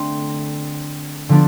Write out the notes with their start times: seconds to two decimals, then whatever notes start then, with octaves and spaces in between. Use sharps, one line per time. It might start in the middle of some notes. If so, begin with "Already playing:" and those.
Already playing: D3 A3 C4 C6
1.29 D3 F3 B3 D4